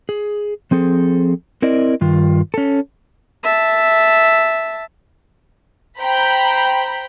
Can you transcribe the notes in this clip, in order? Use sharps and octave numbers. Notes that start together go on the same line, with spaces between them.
G#4
F3 C4 G#4 A4
C4 E4 A#4 D5 D#5
G2 D#3 F4
C#4 A4
E5 A5
C5 G5 A#5 B5